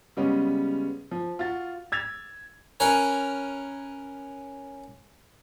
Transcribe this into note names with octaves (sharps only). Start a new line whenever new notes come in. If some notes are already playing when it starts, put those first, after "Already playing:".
C#3 G3 G#3 B3 C#4
F3
F4 F#4 A6
E6 G#6 A6 F7
C#4 A#4 B4 C#5 G#5